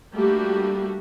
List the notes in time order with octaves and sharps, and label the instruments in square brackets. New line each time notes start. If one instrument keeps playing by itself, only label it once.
[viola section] G3 A3 A#3 D4 F#4 G4